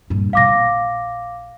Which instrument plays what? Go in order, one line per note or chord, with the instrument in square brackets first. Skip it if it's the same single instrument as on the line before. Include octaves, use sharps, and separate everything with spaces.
[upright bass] G2 A#2
[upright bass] B2 G3 [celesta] F5 D6 A#6
[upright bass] A#1